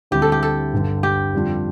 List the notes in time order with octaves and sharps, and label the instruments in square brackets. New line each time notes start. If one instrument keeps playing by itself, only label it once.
[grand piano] D2 D3 G3 C4 E4 [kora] G4
[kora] A4
G4
A4
[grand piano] G1 G2 D3
[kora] G4
[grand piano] F2 D3 G3 D4 F4